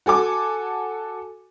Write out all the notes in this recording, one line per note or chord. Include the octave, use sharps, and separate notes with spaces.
F#4 A4 G#5 D6